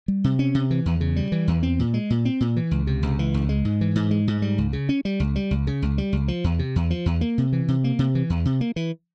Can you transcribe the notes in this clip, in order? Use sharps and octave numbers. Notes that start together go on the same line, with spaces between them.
G3
C3
C#4
C3
E3
E2
C#3
G3
E3
E2
C4
A#2
G#3
A#2
C4
A#2
E3
C#2
C3
C#2
E3
C#2
G#3
G#2
E3
G#2
G#3
G#2
G3
C#2
C#3
C#4
G3
C#2
G3
C#2
C#3
C#2
G3
C#2
F3
E2
C3
E2
F3
E2
A#3
C3
E3
C3
A#3
C3
E3
E2
C3
A#3
E3